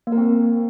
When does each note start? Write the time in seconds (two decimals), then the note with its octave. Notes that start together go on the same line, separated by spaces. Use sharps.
0.07 A#3
0.12 A#4
0.18 C4